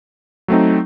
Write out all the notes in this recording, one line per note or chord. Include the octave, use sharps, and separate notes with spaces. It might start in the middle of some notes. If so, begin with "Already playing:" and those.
F#3 A3 C4 D#4